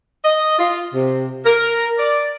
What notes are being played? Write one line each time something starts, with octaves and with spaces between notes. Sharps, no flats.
D#5
F4
C3
A#4
D5